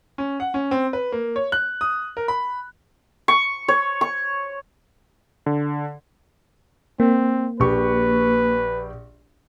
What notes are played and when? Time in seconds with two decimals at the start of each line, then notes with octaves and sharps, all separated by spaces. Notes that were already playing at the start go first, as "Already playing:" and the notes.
0.18 C#4
0.40 F#5
0.54 C#4
0.71 C4
0.93 B4
1.12 A#3
1.36 C#5
1.52 F#6
1.81 D#6
2.17 A#4
2.28 B5
3.28 C#6
3.68 C#5
4.01 C#6
5.46 D3
7.00 A#3 C4
7.60 A#1 G4 B4 C#6